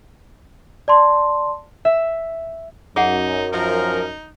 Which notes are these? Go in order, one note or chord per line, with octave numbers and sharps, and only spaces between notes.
D5 A5 C6
E5
F#2 D#4 G#4 F#5
F3 D#4 A#4